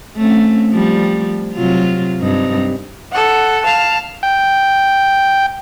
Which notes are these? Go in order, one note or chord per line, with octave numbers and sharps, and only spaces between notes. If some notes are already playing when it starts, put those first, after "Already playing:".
A3 C4 C#4
F3 G3
C3 F#3 F4
G2 C4 D#4
A4 F#5
F5 A5
G5